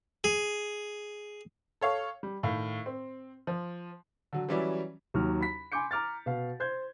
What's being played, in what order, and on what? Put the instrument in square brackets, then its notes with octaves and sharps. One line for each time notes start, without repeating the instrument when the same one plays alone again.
[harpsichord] G#4
[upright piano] A4 C#5 F5
G3
A2 D#3 F5
C4
F3
[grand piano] D3 F#3
E3 F#3 G3 C#4 D5 E5
D#2 F#3 F6
B5 B6
G#5 B5 C6 D6 G6 C#7
A#5 D6 F6 A6
B2 F5
C5 G6 G#6